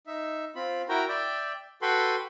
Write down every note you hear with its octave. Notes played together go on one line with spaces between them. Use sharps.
D#4 E5
C4 F4 B5
E4 F#4 A#4 G5 A#5
D5 E5 G5
F#4 A4 B4 G5 B5 C6